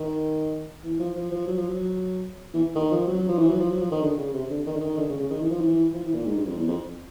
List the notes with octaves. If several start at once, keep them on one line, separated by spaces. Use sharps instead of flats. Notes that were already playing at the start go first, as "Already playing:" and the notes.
Already playing: D#3
E3
F3
F3
F3
F#3
F3
F#3
E3
D#3
F3
F#3
F#3
F3
E3
F#3
F3
F#3
F3
D#3
D3
C#3
C3
D3
D#3
D3
D#3
D3
C#3
C#3
D#3
E3
F3
E3
F3
E3
A#2
G#2
G2
F2
E2
F2